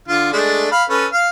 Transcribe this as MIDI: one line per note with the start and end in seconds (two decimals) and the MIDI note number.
0.08 0.28 50
0.08 0.28 65
0.33 0.67 56
0.33 0.67 57
0.33 0.67 62
0.71 0.84 77
0.71 0.84 83
0.90 1.06 61
0.90 1.06 69
0.90 1.06 71
1.12 1.29 77